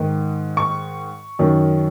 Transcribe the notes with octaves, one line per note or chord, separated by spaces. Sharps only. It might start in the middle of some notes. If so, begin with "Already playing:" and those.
Already playing: G#2 D#3
C#6
F#2 D#3